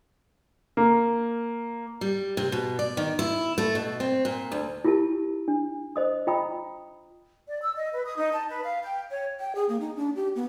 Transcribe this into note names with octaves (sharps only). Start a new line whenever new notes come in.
A#3
G3
C3
B2
D5
D#3
E4
A3
B2
C4
A#2
D2
E4 F4 G4 A#4 A5
D4
C5 D#5 D#6
F4 D#5 G5 A#5 B5 D#6
D5
E6
D#5
B4
D#6
D#4
A5
B4
F5
G5
C#5
G5
G#4
A#3
D#4
D4
G4
B3